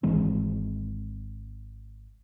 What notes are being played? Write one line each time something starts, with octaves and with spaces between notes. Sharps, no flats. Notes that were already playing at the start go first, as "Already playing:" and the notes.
G#1 E3 G#3 C4